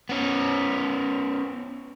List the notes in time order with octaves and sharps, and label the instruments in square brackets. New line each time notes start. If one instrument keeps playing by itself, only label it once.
[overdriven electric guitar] B3 C#4